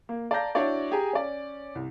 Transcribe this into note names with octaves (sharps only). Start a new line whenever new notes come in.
A#3
D5 F5 A5 A#5 G6 A#6
D4 E4 F#4 C#5 D5
G4 G#4 G5 G#5 A#5
C#4 D5
C2